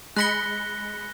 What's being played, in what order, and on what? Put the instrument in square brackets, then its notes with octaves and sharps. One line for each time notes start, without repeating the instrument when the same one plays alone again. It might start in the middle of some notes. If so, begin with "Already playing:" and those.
[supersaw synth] G#3 B5 C#7 [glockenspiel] F#6 A#6 G7